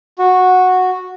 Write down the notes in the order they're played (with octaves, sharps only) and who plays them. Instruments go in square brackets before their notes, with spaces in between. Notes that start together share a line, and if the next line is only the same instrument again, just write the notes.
[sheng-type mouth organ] F#4